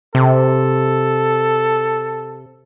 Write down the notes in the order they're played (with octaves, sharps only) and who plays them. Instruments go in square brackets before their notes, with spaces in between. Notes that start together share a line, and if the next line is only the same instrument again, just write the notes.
[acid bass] C3 [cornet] A4